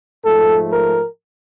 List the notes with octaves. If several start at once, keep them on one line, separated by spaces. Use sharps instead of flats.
G#2 F3 A3 A4
A#4